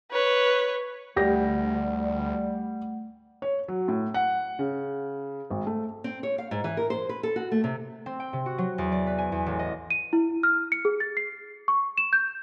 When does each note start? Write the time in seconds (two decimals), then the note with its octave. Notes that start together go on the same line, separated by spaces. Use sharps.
0.12 B4 C#5
1.16 D2 G3 A3 G4 F#5 A#6
3.42 C#5
3.68 F#3
3.88 A2
4.14 F#5
4.59 C#3
5.50 G#1
5.66 A3
6.04 C4
6.23 C#5
6.38 F5
6.51 G#2
6.64 E3
6.77 A#4
6.90 C5
7.09 B4
7.23 A4
7.36 F#4
7.52 A3
7.64 C3
8.06 C4
8.20 G5
8.33 C3
8.46 F#4
8.58 F#3
8.78 E2
8.92 D5
9.07 B4
9.18 G#5
9.32 E2
9.46 A1
9.59 D#5
9.90 D#7
10.13 E4
10.43 F6
10.72 C#7
10.85 G#4
11.00 A6
11.17 C7
11.68 C#6
11.98 E7
12.13 G6